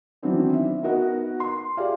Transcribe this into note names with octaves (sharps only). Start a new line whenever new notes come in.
D#3 E3 F#3 B3 C4 D4
E5
B3 D#4 F#4 A#4 D#5 F#5
C6
G4 G#4 D5 F5